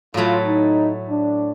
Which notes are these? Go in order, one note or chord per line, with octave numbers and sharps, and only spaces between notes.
A2 F#3 A3 F4
D#4
D4